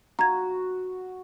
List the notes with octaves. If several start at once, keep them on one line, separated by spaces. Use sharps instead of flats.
F#4 A#5 G#6